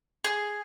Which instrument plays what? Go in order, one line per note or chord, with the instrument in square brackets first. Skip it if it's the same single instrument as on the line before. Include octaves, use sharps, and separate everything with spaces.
[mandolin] G#4